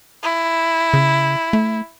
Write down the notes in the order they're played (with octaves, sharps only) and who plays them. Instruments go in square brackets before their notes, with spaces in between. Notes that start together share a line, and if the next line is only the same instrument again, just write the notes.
[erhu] E4
[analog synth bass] C#3
A3